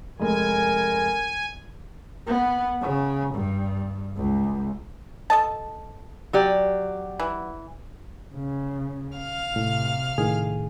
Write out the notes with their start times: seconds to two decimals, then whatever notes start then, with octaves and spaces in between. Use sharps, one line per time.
0.20 F1 G#3 A#4 G#5
2.27 B3
2.81 C#3
3.35 G2
4.17 C#2
5.30 A4 D#5 A5
6.33 F#3 G4 D5
7.20 E3
8.35 C#3
9.18 F5 F6
9.56 A2 C3
10.18 A2 D#3 G#4